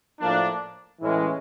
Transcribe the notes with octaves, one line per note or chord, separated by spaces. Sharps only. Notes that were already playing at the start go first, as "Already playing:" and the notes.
A2 F3 A#3 D4
A2 E3 G#3 C#4